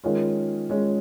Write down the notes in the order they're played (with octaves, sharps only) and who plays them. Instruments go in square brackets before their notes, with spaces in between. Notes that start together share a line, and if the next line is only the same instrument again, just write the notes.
[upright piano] D#3 G#3 C#4 F4
D#3 G#3 C#4 F4